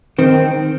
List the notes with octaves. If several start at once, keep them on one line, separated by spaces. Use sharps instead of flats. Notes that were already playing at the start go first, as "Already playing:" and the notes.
D#3 C4